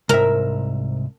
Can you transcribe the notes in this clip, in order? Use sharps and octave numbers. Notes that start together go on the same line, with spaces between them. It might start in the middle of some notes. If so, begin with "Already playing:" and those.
C2 G#2 A#4 E5